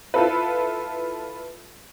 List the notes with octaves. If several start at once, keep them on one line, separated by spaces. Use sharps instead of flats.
E4 F4 A4 B4